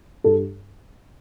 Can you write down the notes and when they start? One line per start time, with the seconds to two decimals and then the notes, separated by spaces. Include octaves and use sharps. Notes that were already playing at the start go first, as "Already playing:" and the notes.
0.24 G2 A4